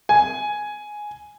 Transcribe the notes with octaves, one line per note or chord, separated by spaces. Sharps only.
G#5